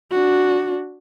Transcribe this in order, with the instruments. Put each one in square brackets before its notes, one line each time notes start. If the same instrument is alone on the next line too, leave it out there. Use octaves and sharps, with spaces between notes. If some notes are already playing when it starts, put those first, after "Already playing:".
[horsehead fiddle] D4 F#4